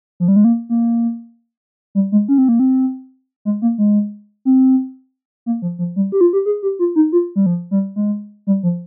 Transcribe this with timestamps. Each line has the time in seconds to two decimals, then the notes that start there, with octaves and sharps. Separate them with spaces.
0.20 F3
0.28 G3
0.36 G#3
0.44 A#3
0.69 A#3
1.95 G3
2.12 G#3
2.28 C#4
2.38 C4
2.48 A#3
2.59 C4
3.45 G#3
3.62 A#3
3.78 G#3
4.45 C4
5.46 A#3
5.62 F3
5.79 F3
5.96 G3
6.12 G4
6.21 F4
6.33 G4
6.46 G#4
6.63 G4
6.79 F4
6.96 D#4
7.12 F4
7.36 G3
7.46 F3
7.71 G3
7.96 G#3
8.47 G3
8.63 F3